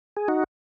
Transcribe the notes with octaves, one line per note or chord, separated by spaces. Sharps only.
G#4
D#4 F#4